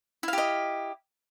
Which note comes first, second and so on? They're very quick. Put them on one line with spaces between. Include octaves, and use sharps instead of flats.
E4 F5 G4 D#5